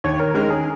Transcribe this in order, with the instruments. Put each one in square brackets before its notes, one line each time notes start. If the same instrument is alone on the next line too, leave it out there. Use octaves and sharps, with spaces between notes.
[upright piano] D#2 [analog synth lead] C#5
[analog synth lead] A#4
[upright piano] D#3 G#3 C#4 [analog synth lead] A#4
[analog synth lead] G#4